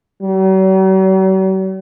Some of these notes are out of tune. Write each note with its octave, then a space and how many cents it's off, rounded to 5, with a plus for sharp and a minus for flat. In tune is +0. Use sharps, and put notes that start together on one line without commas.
F#3 +45